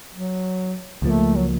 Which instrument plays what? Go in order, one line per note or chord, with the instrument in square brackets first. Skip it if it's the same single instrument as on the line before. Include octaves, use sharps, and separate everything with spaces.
[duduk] F#3
[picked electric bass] C#2 C#3 F3 A#3 [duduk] A3
[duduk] F#3